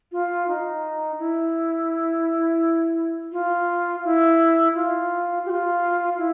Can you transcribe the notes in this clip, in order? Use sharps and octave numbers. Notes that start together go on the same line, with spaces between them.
F4
D#4
E4
F4
E4
F4
G4
F4
E4